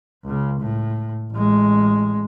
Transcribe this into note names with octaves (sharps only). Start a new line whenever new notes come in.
C#2 C#3
A2
A1 G#3